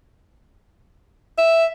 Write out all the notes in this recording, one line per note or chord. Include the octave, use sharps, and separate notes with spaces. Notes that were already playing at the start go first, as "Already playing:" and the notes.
E5